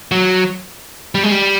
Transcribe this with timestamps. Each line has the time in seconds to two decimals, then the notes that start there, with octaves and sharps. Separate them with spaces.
0.12 F#3
1.15 G3
1.23 G#3
1.31 G3